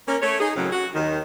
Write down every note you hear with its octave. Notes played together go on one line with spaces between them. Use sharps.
A#3 C#4 A#4
A3 C#5
D#4 G#4
F#2 A2 C#3 F#3 C4
F#4
D#2 D#3